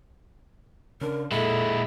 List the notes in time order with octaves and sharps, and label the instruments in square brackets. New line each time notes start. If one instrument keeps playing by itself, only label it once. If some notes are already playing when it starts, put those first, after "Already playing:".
[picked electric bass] C#3 D4 [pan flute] A#4
[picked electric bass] A#2 [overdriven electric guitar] G#3 E4 [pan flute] A4